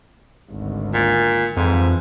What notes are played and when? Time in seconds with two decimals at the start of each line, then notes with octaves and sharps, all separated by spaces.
0.51 G#1 D2
0.94 A#2
1.57 F2 G#2 E3 F3